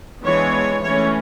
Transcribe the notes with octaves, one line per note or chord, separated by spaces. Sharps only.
E3 G#3 B3 D4 C#5
E3 A3 C#4 C#5